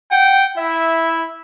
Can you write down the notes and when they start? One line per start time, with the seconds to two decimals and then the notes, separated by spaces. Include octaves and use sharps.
0.11 F#5 G5
0.57 E4 E5